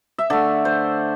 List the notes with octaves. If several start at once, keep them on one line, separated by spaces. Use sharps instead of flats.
E5
D3 A3 D5
C5